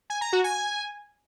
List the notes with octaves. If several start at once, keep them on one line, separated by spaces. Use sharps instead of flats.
G#5
A#5
F#4
G#5